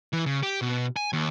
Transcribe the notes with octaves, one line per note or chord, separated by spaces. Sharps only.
E3
C#3
G4
B2
G#5
D#2